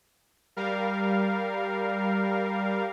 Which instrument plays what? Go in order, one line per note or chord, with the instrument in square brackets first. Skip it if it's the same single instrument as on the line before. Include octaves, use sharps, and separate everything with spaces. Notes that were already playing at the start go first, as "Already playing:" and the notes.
[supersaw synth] G3 A#4 F5